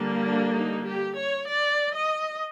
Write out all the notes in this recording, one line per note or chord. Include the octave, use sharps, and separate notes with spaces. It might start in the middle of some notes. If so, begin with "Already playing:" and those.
Already playing: D3 G3 A#3
D4
D#4
G4
C#5
D5
D#5